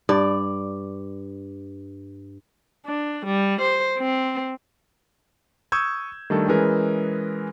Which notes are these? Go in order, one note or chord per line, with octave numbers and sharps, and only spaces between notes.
G2 D5
D4
G3
C5
C4
C#6 D#6 E6 G6 G#6
D#3 G3 A3 D4 A4
E3 G#3 C#4 G#4 A#4 B4